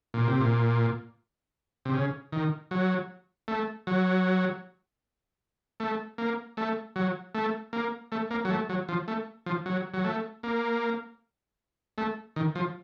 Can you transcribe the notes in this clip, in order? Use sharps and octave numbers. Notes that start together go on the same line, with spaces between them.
A#2
C3
A#2
C3
C#3
D#3
F#3
A3
F#3
A3
A#3
A3
F#3
A3
A#3
A3
A#3
F#3
A3
F#3
F3
A3
F3
F#3
F#3
A3
A#3
A3
D#3
F3